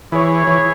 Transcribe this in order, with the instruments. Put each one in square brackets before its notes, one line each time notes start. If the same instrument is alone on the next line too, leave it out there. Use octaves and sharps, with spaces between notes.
[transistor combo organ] E3 [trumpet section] E4 G#4 C#5
[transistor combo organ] E3